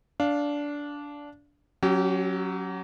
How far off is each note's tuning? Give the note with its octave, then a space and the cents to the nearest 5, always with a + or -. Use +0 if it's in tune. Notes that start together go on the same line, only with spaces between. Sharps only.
D4 -15 F5 +0
F#3 +0 C#4 +0 G4 -35